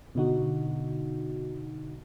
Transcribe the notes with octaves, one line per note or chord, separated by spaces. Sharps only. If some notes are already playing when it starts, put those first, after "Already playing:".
B2 D3 D#4 F#4